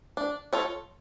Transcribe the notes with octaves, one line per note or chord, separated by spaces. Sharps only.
D4
F4 A4 C#5